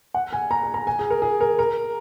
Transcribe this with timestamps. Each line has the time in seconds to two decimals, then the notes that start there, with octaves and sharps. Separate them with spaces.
0.14 F#5
0.33 G#5
0.51 A#5
0.63 G#5
0.74 A#5
0.87 G#5
0.99 G#4
1.10 A#4
1.22 G#4
1.41 A#4
1.59 A#4